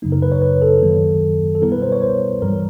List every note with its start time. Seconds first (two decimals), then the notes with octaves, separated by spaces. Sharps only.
0.02 F#2 C#3 F#3 A#3 D#4
0.12 A#4
0.22 B4
0.32 C#5
0.42 B4
0.62 A4
0.82 F#2 D#3 F#3 A#3
1.55 A4
1.62 B2 G3 B3 E4 A#4
1.72 B4
1.82 C5
1.92 C#5
2.02 C5
2.42 G2 E3 G3 A#4